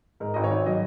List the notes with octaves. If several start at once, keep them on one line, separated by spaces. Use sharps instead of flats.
G#2 A#4
G#1 D#5
C#5
G#1
F#3 D#5